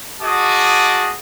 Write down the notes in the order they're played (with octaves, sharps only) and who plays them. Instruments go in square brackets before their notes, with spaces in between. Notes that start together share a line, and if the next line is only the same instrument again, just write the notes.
[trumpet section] F#4 G#4 D#5 A5 D6 D#6